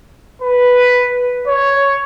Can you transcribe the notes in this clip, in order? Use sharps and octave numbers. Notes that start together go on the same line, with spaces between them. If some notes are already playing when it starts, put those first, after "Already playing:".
B4
C#5